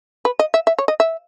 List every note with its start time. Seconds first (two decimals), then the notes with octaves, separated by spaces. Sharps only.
0.25 B4
0.39 D#5
0.54 E5
0.67 E5
0.79 C#5
0.88 D#5
1.00 E5